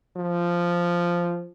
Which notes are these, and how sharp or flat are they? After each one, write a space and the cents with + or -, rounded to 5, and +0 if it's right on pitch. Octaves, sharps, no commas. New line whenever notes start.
F3 -5